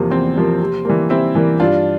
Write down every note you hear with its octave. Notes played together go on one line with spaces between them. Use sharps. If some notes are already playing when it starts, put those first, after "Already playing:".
Already playing: E2 C3 F3 A#3
E2 C4
C3 F3 A#3
C3
E3 G3 A#3
C3 C4 E4
E3 G3 A#3
G2 D4 F4